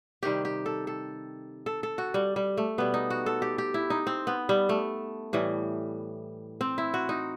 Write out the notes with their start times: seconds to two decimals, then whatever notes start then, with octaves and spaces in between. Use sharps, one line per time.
0.23 C3 D#3 G3 G4
0.45 G4
0.66 A4
0.87 A4
1.66 A4
1.83 A4
1.98 F#4
2.14 G3
2.36 G3
2.57 A3
2.78 B2 G3 B3
2.94 D#4
3.10 F#4
3.26 A4
3.42 G4
3.58 G4
3.74 E4
3.90 D#4
4.07 C4
4.27 B3
4.49 G3
4.69 A3
5.33 A2 E3 G3
6.61 C4
6.78 E4
6.94 F#4
7.09 D#4